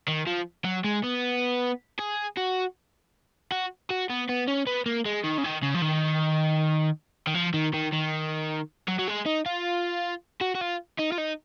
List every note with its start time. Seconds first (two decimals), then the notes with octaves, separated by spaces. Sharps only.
0.08 D#3
0.27 F3
0.65 F#3
0.84 G#3
1.03 B3
1.99 G#4
2.37 F#4
3.52 F#4
3.91 F#4
4.10 B3
4.29 B3
4.48 C#4
4.67 B3
4.86 A#3
5.06 G#3
5.24 D#3
5.38 C#3
5.44 D#3
5.63 C#3
5.75 F3
5.82 D#3
7.27 D#3
7.34 F3
7.54 D#3
7.74 D#3
7.93 D#3
8.88 F#3
8.99 F#3
9.08 G#3
9.26 D#4
9.46 F4
10.41 F#4
10.55 F#4
10.61 F4
10.99 D#4
11.12 F4
11.18 D#4